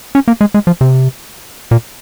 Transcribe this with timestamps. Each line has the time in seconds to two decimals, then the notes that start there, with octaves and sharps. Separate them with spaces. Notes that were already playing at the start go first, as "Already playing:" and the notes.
0.15 C#4
0.28 A#3
0.41 G#3
0.54 G#3
0.67 F3
0.81 C3
1.71 A#2